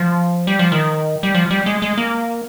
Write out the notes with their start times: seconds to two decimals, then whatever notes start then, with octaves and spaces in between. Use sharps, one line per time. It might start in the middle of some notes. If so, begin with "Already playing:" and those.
Already playing: F3
0.47 G3
0.59 F3
0.72 D#3
1.23 G3
1.35 F3
1.51 G3
1.66 G#3
1.82 G#3
1.98 A#3